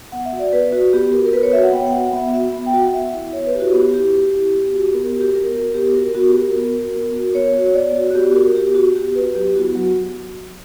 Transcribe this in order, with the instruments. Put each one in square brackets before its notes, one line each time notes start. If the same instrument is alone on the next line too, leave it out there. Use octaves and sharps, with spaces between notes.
[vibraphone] B3 F#5
E5
F#4
D5
B3 B4
F#4
B3 G4
F#4 A#4
A#4
B3 B4
C#5
F#4 E5
F#5
B3 G5
F#5
F#4
F#5
B3 E5
F#4 E5
B3
G5
F#4
F#5
B3 E5
E4
B3 C#5
B4
E4 G4
F#4
B3 G4
E4 G4
B3
E4
B3
F#4
B3 A#4
G4
F#4
G4
B3 A#4
F#4
B3 G4
F#4 A#4
B3 F#4
G4
F#4
A#4
B3
F#4
B3
F#4
B3 C#5
F#4
B3 D5
F#4
F#4
B3 G4
F#4 A#4
B3 G4
F#4
B3 G4
F#4 B4
F#3 G4
B3 E4 F#4
F#3 F#4